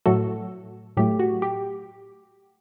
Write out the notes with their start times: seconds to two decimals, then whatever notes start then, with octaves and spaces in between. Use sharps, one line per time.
0.06 A2 F#3 A3 F#4 A4
0.97 A2 F#3 A3 G4
1.19 F#4
1.42 G4